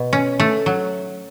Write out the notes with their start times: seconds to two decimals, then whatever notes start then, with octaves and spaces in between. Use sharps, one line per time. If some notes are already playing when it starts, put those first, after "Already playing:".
Already playing: B2
0.13 C#4
0.40 A3
0.66 F#3